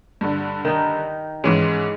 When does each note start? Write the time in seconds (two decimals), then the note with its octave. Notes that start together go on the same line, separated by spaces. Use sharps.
0.21 G2 D3
0.65 D#3 D#4
1.44 G#2 E3 G#3 C#4